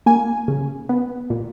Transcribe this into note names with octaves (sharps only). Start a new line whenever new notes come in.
A#3 G#5
C#3
B3
A#2